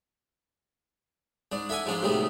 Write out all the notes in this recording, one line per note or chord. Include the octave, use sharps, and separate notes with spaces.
G#2 D4
E4 A4 F#5 G#5
G#2 F3 G#3 D4
D2 A2 C3 D#3 G#3 B3